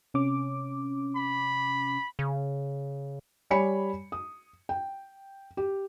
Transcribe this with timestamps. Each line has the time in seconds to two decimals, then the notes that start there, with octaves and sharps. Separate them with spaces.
0.14 C3 C#4 D6
1.16 B5
2.19 C#3
3.50 G3 C#5 D5 G#5 B5 C#7
4.12 D#6
4.69 G5
5.57 G4